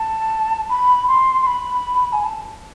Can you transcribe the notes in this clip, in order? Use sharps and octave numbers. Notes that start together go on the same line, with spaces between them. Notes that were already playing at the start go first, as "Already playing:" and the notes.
Already playing: A5
B5
C6
C6
B5
G#5
A5